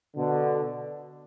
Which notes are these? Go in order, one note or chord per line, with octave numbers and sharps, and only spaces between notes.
B2 D3